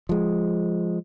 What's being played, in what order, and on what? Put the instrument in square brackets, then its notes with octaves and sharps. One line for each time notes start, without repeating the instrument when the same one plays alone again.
[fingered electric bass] F3 G#3